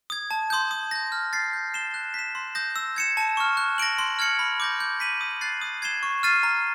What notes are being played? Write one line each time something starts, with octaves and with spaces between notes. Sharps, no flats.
D#6 G#6
A5
C6 D#6 G6
D#6
G6 A#6
F6
A6 C7
G6
C7 E7 G7
F#6
B6 E7
C6
D#6 G6 A#6
E6
G#6 C#7 E7
A5
C#6 F6
F#6
A#6 D7 F#7
C6
F6 G#6 C#7 F#7
B5
D6 G6 A#6
G6
B6 D#7 F#7
D#6
F#6 A6 C7
D#6
G#6 C7 E7 G7
C#6
F6 A6 C7 D#7
A#5